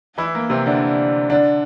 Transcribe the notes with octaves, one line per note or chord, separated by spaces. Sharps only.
E3 E4
A#3
C3 C4
D3 D4
D3 D4